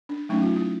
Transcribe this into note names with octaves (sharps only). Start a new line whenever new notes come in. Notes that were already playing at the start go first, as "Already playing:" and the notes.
D4
F#3 A3 C#4 D#4
F4
E4